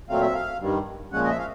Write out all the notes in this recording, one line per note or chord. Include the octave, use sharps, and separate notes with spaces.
A#2 F#3 A3 C4 F5
E5
F5
G2 D#3 G3
A#2 F3 G#3 C#4 F#5
D#5
E5
F5